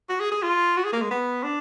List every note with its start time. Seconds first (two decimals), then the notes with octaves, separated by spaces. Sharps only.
0.09 F#4
0.20 G#4
0.31 G#4
0.43 F4
0.77 F#4
0.85 G#4
0.93 A#3
1.02 G#3
1.11 B3
1.44 D4